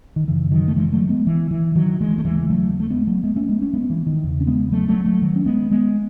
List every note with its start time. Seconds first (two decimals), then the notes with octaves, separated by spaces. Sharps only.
0.16 D#3
0.28 F#2 C#3 E3
0.52 D#3 F#3
0.68 A3
0.76 E3 G#3
0.93 F#3 A3
1.09 G#3 B3
1.27 E3
1.51 E3
1.75 D#3 F#3
2.01 E3 G#3
2.18 A3
2.25 D#2 C#3 E3 G#3
2.50 F#3 A3
2.80 A3
2.90 G#3 B3
3.07 F#3 A3
3.24 G#3 B3
3.36 A3 C#4
3.48 G#3 B3
3.61 A3 C#4
3.74 G#3 B3
3.90 E3
4.06 D#3
4.23 E2 C#3
4.41 C#4
4.47 G#3 B3
4.72 F#3 A3
4.88 F#3 A3
5.05 F#3 A3
5.22 D#3 F#3
5.36 C#4
5.46 G#3 B3
5.71 G#3 B3